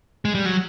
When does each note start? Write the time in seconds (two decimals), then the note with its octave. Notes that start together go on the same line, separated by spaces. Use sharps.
0.25 G#3
0.35 G3
0.45 F#3